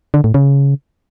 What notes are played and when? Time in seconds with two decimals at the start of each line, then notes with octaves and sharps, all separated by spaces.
0.14 D3
0.24 A2
0.34 C#3